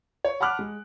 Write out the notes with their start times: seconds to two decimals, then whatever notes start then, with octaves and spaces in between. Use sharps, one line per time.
0.25 C#5
0.40 F#5 A5 B5 D6 F6 F#6
0.59 G#3